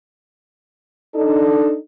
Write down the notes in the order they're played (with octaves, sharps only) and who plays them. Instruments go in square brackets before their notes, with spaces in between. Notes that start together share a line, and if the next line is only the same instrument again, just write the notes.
[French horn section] D4 D#4 A4